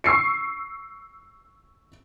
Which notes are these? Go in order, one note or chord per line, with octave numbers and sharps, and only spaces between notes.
C#6 E6 C7 C#7